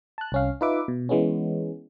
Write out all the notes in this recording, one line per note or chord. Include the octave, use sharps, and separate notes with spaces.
A5 F#6
C2 C#4 F5
D#4 F4 B4 E5 D6
B2
E3 G#3 B3 C#4